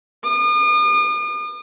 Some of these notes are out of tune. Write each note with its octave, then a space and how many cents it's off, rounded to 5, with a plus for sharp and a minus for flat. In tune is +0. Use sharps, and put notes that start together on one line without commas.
D#6 -45